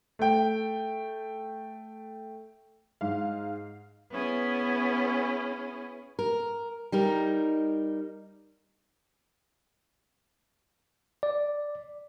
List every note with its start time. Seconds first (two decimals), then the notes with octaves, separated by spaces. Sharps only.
0.19 A3 G5
3.01 G#2 F5
4.11 B3 C#4 E4 G#4
6.19 A#4
6.92 G3 D#4 A#4
11.23 D5